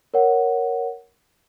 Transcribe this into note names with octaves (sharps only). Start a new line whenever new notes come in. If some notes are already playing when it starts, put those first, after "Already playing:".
A#4 C#5 F#5